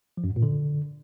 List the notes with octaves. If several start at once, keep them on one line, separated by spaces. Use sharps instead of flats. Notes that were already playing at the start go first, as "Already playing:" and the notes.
F3
F#2
G#2
A#2
D3